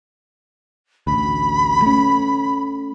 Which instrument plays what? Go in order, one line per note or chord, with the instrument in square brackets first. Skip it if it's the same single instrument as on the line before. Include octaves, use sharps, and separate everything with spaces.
[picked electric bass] A1 D2 [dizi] B5
[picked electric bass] A3 C#4